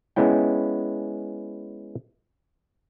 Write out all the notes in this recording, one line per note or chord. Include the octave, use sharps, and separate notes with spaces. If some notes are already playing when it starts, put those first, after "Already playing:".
G#3 B3 C#4 E4 G5